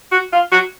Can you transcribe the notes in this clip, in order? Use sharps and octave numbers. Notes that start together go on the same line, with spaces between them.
F#4
F4
F#4